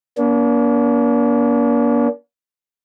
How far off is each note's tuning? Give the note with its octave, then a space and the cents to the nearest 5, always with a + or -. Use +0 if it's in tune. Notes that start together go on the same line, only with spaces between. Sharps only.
A#3 +35 D4 -40